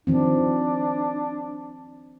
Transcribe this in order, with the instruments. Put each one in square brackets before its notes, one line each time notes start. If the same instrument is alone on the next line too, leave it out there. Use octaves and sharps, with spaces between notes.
[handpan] D#3 F3 C4 [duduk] D4